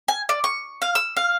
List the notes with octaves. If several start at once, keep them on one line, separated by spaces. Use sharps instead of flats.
G#5
D5
C#6
F5
E6
F5